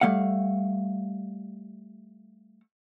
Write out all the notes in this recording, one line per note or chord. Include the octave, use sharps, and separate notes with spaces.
G3 A3 F5 F#5